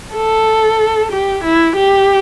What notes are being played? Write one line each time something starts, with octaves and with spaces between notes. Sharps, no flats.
A4
G4
E4
G4